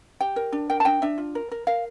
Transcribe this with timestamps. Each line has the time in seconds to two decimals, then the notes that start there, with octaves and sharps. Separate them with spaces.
0.21 G4 G5
0.36 A#4
0.53 D4
0.70 A#4 G5
0.80 A5
0.85 D4 G5
1.02 D4 E5
1.18 F4
1.35 A#4
1.51 A#4
1.67 A#4 F5